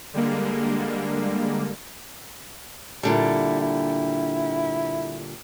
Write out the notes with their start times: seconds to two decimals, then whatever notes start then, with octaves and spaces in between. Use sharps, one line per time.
0.14 D3 G3 G#3 A#3
3.03 A#2 D3 G3 E4
3.60 E4